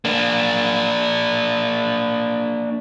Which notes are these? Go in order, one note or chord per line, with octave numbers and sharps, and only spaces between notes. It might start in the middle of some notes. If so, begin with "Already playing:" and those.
A#3 D4